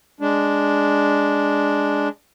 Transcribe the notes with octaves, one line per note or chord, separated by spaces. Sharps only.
G#3 D4